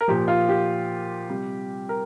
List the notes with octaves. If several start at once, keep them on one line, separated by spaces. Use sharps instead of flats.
A#4
A#2 F3 G4
F4
G4
C3 G3
A#4